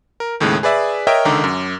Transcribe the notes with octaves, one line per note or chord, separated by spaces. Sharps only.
A#4
D#2 A2 C#3 G#3 F#6
G#4 B4 D5 E5
A#4 C#5 D#5 E5 G5 C#6
C#2 D3 D#3 A#5 D6
F#2